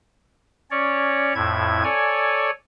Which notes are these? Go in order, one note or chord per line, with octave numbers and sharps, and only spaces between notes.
C#4 C#5 D5
F2 A2 E4 G#6
A4 C#5 D5 G#5